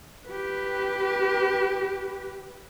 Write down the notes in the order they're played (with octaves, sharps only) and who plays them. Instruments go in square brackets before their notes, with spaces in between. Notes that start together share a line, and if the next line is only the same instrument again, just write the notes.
[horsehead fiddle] G4 B4